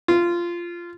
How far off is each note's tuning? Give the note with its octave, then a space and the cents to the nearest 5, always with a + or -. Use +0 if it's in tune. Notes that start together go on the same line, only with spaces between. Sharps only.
F4 -15